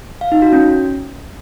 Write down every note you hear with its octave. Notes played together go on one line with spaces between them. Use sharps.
F5
D#4
F#4
C#4